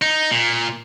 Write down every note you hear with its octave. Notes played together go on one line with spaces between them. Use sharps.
D#4
A#2